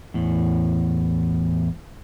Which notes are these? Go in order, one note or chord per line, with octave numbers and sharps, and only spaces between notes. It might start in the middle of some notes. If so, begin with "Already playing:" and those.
E2 A2